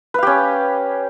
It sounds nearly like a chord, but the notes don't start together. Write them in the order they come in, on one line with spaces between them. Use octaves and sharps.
B4 F5 G4 C#4